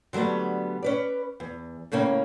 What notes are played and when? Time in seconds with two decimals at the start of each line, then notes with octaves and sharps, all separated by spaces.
0.13 D3 F#3 G3 A3 B3
0.83 C#4 B4 D5
1.40 E2
1.92 A2 C#3 A#3 C#4